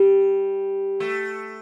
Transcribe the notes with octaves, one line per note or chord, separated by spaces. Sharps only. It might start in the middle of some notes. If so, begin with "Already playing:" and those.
Already playing: G3
A3